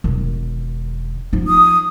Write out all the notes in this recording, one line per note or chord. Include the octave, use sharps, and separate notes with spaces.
E1 D#3
F3 D#4
D#6